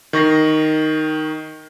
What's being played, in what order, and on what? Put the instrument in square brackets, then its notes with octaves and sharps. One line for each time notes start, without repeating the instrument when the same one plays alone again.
[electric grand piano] D#3 C#6 A#6 C7